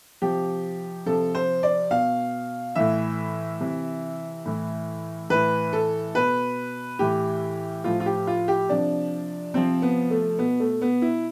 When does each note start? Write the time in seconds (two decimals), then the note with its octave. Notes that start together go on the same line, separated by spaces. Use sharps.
0.22 C3 F3 G4
1.06 C3 F3 A4
1.35 C5
1.63 D5
1.91 B2 F5
2.75 A2 E3 E5
3.60 C3 E3
4.45 A2 E3
5.30 A2 E3 B4
5.73 A4
6.15 B2 B4
6.99 A2 E3 G4
7.84 A2 F3 F4
8.00 F4
8.06 G4
8.27 F4
8.48 G4
8.69 C3 F3 D4
9.54 C3 F3 C4
9.82 B3
10.10 A3
10.39 B2 B3
10.60 A3
10.82 B3
11.02 E4